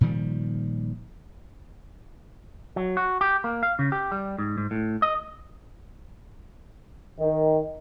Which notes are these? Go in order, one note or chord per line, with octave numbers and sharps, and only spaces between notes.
A#2 D#3 F3 G3
F#3
F#4
G4
A#3
F5
C#3
G4
G3
G#2
G#2
A2
D#5
D#3